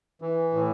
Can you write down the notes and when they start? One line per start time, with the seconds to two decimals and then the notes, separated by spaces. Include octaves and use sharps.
0.22 E3
0.53 A2